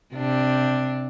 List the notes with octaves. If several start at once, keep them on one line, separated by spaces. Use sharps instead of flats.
C3 D4